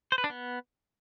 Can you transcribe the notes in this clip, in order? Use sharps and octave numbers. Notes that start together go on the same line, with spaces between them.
C5
B4
D4
B3